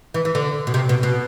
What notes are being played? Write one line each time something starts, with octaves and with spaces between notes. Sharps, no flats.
E3
E3
D3
B2
C3
B2
B2